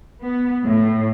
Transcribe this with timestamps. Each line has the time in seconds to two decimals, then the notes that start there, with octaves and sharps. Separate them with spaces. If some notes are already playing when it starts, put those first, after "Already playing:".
0.22 B3
0.65 A2